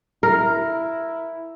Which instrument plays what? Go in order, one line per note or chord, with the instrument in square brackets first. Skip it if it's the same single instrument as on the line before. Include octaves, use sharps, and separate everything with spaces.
[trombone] E4 [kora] A#4